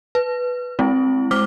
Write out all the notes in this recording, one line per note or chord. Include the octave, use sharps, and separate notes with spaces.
B4
G#3 C4 E4
G#3 C5 D6 F6 G7